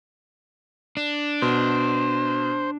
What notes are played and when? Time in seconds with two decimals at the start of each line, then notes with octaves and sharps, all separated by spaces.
0.97 D4
1.42 B2 C5